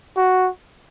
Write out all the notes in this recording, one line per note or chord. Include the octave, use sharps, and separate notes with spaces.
F#4